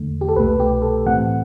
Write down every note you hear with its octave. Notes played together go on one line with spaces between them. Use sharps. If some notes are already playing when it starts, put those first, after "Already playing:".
Already playing: E2 D3 A3
G4
A4
C2 B2 A3 B4
G4
A4
A2 E3 A3 C4 F#5